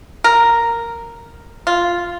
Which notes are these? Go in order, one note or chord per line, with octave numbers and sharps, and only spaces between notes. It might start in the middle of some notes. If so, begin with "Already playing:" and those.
A#4
F4